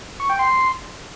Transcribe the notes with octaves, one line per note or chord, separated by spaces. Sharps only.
C#6
G5
C6